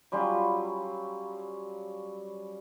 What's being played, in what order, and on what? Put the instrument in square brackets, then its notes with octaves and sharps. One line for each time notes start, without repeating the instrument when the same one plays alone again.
[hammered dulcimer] F#3 G3 C#4 F4